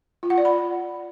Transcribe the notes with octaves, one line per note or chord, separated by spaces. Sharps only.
F4
F#5
D5
B5